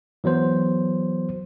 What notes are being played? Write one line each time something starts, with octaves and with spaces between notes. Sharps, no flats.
E3 F#3 B3 C5